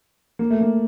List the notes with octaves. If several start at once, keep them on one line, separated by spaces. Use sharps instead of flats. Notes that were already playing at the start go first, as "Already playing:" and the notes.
A#3
A3
A#3